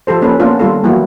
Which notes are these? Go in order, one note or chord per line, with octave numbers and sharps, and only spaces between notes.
F3 G4 A4 C5
A#3 C#4 A4 B4
A#3 B3 C#4 D4 F4
D#3 G3 F4 A4
E3 F#3 A#3 E4 F#4